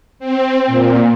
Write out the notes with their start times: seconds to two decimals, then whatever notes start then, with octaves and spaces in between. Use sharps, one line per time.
0.19 C4
0.67 A#2